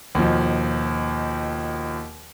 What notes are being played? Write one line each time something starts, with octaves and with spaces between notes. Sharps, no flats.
D#2 B2 F3